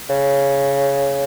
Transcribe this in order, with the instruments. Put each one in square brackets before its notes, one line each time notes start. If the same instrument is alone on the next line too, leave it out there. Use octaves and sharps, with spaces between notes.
[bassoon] C#3